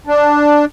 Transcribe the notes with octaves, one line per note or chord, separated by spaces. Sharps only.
D4